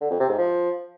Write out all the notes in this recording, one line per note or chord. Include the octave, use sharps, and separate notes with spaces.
D3
F2
C3
G#2
F3